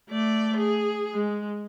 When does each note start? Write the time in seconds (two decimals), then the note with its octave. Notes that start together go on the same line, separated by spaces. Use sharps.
0.10 A3 D5
0.57 G#4
1.14 G#3